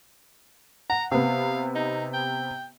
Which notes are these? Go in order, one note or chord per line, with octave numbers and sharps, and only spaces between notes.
F#5 A#5
C3 B3 F5
D#4
G5